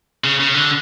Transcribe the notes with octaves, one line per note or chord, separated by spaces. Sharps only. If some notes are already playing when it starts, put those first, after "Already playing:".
C#3
C#3
D3